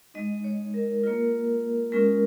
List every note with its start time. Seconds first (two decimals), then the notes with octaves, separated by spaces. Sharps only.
0.14 G#3 D#4 D#5
0.44 C#5
0.74 A#4
1.03 A#3 F4 A#4
1.92 G#3 C#4 F4 A#4